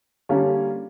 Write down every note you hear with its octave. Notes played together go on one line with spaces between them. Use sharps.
D3 G3 A#3 C#4 F4